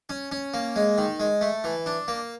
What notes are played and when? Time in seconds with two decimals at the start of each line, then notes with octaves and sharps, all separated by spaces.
0.09 C#4
0.32 C#4
0.54 A#3
0.76 G#3
0.98 D#3
1.20 G#3
1.41 A3
1.64 E3
1.86 D4
2.08 A#3